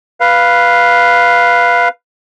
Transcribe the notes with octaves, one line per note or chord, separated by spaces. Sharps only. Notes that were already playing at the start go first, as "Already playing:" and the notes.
B4 F5